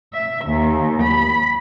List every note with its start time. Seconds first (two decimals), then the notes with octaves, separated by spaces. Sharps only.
0.14 E5
0.46 D#2
1.02 B5